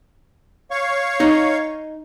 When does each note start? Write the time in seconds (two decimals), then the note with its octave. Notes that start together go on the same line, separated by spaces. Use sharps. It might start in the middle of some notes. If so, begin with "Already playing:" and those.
0.71 C#5 F5 C#6
1.20 D#4